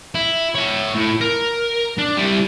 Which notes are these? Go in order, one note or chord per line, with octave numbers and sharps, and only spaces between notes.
E4
C#5 E5
A2
A#4
D4
G3 E4